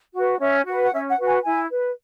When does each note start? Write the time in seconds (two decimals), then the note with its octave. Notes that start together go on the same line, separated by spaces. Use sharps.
0.14 F#4 B4
0.40 C#4 E5
0.67 F#4 B4
0.81 F#5
0.93 C#4 E5
1.09 F#5
1.18 F#4 B4
1.27 G#5
1.44 E4 G#5
1.70 B4